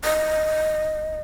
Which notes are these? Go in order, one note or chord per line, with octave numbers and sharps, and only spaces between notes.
D#5